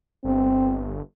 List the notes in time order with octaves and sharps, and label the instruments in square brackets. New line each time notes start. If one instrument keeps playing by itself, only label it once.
[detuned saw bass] G1 [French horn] C4